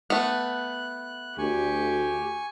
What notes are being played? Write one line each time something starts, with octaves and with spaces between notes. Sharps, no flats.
A3 B3 F#6
D2 G4 G#5 C#6